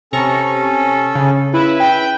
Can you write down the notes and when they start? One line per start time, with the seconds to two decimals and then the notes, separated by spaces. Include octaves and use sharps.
0.13 C3 C#4 A4 A#5 C#6
1.15 C#3
1.54 E4 B4 E5 B5
1.80 G5